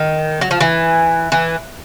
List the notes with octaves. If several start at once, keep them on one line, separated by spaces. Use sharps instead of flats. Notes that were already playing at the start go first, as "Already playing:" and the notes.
Already playing: D#3
F#3
F3
E3
E3